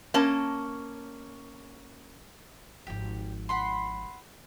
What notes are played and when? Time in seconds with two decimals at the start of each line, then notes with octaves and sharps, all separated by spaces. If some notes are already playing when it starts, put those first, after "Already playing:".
0.14 A#3 C#4 A5
2.87 G#1 F3 G4
3.49 F#5 B5 C6